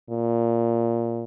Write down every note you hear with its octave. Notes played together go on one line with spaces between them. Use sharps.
A#2